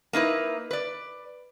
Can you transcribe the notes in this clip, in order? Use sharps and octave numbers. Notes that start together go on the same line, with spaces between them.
A#3 D#4 E4 B4
B4 D5